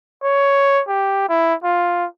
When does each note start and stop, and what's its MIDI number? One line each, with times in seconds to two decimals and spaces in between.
0.23 0.83 73
0.88 1.24 67
1.29 1.55 64
1.64 2.06 65